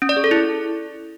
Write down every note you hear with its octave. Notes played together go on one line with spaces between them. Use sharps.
C#4
D5
G#4
A4
E4